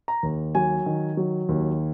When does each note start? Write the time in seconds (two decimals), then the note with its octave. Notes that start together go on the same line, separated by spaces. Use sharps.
0.08 A#5
0.23 D#2
0.55 F#3 G#5
0.86 D#3
1.17 F#3
1.49 D#2